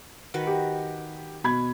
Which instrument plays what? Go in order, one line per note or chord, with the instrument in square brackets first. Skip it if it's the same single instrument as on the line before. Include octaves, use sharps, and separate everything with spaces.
[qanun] D#3 F#4 B4
[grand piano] G4
B2 B5 G#6